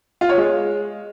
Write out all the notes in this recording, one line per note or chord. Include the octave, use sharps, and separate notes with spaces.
F4
C#5
G#3